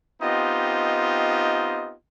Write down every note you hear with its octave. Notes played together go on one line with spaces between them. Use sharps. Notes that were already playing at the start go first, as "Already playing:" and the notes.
B3 C4 D#4 F4 G4 D#5